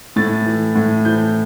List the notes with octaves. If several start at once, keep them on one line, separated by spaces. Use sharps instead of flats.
A2 A6
E3
A2
E3 G6